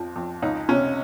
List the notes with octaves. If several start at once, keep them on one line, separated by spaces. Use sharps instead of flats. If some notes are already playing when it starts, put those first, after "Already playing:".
Already playing: F2 F3
F2
C#2 D#4
C3 C#4